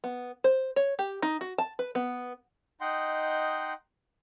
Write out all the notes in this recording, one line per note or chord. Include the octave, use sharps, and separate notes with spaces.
B3
C5
C#5
G4
D#4
F#4
A5
B4
B3
D#4 D#5 F#5 G5 C6